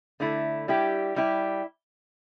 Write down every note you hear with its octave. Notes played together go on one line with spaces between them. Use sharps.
D3 A3 E4
G3 E4 G4
G3 E4 G4